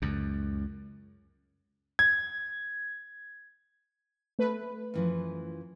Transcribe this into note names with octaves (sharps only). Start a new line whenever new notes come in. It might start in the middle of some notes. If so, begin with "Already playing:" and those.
C#2 F#2
G#6
A3 B4
F#2 E3 F3